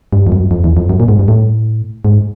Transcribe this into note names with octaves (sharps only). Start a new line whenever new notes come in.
G2
F2
F#2
F2
E2
F2
F#2
A#2
G#2
G2
A2
G#2